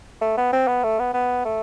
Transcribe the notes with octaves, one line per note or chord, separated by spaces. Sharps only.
A3
B3
C4
B3
A3
B3
B3
A3